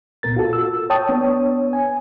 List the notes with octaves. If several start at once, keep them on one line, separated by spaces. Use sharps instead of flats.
C2 A#2 B3 A#4 A6
F4 F#4 A4
E6
C#5 G5 A5 D#6
B3 D4 C#5
G#5